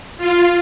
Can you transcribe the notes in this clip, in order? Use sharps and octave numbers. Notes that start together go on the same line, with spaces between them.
F4